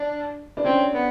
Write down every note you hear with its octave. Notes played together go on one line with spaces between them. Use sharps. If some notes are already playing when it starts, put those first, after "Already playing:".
Already playing: D4
D4
C4 C#4
B3